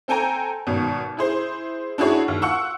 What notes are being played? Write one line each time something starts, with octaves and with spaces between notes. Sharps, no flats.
C4 A4 G5 G#5 A#5
G#1 B2
E4 G#4 C5
D4 E4 F#4 G#4 C#5
D#2
F4 F#5 C#6 E6